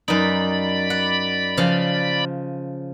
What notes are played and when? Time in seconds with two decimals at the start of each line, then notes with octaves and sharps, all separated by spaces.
0.08 F#2 D#4 D5 B5
0.90 F#5
1.57 C#3 F3 F5